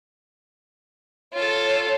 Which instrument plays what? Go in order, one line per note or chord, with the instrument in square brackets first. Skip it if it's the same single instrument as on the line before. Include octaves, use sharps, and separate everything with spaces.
[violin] F4 A4 [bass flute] C#5